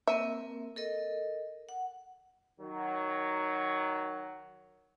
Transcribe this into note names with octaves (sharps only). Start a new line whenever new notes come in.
A#3 C4 A#4 E5
A4 A#4 D#5
F#5
D#3 F#3